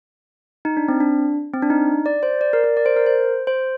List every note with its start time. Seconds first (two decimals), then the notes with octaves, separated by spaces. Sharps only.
0.65 D#4
0.77 D4
0.88 C4
1.00 D4
1.54 C4
1.62 D4
1.70 D#4
2.06 D5
2.23 C5
2.41 D5
2.53 A#4
2.64 A#4
2.77 D5
2.86 C5
2.96 A#4
3.06 C5
3.47 C5